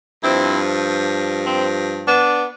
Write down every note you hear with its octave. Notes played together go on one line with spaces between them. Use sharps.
G2 F3 C4 E4
C4
B3 D4